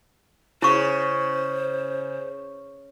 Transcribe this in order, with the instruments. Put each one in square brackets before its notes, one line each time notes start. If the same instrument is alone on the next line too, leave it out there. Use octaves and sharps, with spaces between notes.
[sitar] C#3 [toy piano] E4 C#6 [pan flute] C5